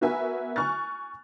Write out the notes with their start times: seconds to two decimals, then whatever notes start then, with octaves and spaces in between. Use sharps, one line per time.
0.01 B3 F#4 A#4 B4 E5 G#5
0.56 G#5 C#6 F6 F#6 A6